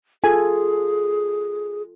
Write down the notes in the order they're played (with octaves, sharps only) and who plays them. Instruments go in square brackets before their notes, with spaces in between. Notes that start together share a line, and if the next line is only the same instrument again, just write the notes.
[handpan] F4 A4 [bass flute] G#4 [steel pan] G#5